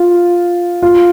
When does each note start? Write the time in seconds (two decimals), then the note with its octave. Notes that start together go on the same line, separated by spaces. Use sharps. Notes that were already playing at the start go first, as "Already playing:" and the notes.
Already playing: F4
0.82 F4